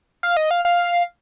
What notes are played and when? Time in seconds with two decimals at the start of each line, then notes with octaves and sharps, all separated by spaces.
0.23 F5
0.37 D#5
0.51 F5
0.65 F5